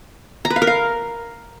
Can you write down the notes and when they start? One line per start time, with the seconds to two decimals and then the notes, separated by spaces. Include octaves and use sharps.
0.45 A#5
0.50 B4
0.56 F5
0.62 A#4
0.67 F5